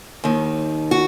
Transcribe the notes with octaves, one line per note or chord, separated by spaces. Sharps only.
D#2 D#3
F#4